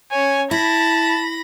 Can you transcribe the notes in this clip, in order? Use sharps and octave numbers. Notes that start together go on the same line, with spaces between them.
C#4 C#5 G#5
E4 A5 B5 A#6